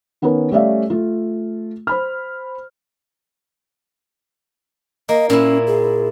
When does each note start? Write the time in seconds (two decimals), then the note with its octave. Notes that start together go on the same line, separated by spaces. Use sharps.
0.22 D#3 B3 C#4 A#4 B4
0.51 G3 A3 C#4 D5 E5 F5
0.90 A3 F4
1.87 C5 B5 F6
5.09 A#3 D#5
5.30 A#2 C#4 E4
5.67 G#4